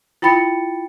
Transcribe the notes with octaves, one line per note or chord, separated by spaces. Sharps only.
E4 F4 G5 B5 A6 C#7